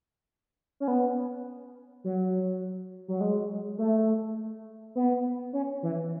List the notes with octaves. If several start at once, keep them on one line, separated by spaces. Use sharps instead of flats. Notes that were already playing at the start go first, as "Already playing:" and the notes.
C#4
B3
F#3
F#3
G#3
A3
B3
C#4
E3